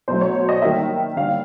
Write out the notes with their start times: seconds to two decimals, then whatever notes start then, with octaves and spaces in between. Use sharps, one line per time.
0.08 B2 F#3 A3 C5
0.21 C#5
0.49 D#5
0.62 D#3 G3 A#3 E5
1.17 D3 G3 A#3 F5